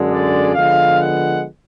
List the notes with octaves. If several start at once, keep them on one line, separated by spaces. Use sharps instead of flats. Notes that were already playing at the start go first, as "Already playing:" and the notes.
Already playing: F#2 D3 G#3
D5
D3 F3 G#3 B3 F5
F#5